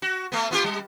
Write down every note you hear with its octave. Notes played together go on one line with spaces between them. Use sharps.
F#4
A3 B3
B3 F4 G4
G3